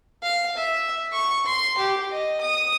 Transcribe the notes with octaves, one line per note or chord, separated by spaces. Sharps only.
F5
E5
C#6
C6
G4
D#5
D#6